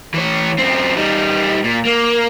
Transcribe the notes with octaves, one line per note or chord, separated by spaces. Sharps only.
E3 C#5
F#2 C4
G3 D#4
A#2
A#3